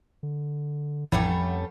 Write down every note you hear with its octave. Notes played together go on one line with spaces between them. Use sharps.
D3
A1 F2 F3 G3 A3 C#4 F#5 B5